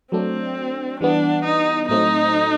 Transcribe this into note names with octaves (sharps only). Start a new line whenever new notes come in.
F#3 A3 C4 D4
E3 G3 B3 D4
D#4
A2 F#3 A3 C4 D#4